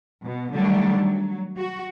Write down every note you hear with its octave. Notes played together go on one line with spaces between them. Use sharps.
B2
D3 D#3 F#3 G3 A3 D4
F#3
F#4